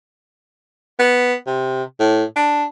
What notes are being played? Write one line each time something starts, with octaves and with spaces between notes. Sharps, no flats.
B3
C3
A2
D4